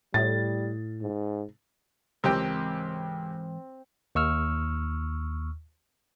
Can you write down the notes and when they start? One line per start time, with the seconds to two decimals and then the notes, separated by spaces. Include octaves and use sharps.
0.14 A2 G3 A6
1.02 G#2
2.24 C#2 G#2 E3 C4 G4 A#4 G5
4.15 D#2 C#6 E6 F6